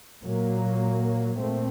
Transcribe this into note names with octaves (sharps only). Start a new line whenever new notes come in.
A#2 F#3 A#3
A#2 A3 C4